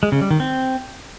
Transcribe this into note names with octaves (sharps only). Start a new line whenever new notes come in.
G#3
C#3
G3
D#3
C4